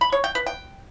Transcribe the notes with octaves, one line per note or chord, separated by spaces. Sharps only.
B5
C#5
G5
B4
G5